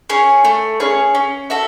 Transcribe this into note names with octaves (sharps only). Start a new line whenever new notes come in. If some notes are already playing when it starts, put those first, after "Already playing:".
C#4 G#4 C#5
A3
C#4 G#4 C#5
C#4
F#4 A4 E5